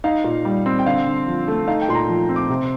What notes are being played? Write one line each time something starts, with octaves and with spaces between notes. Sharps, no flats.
D#4 F5
A#2
G3
C4
G5
D3 F5
D3
F3
A3
D#4 F5
G5
A#2 C6
A#5
F3
C4
D6
C3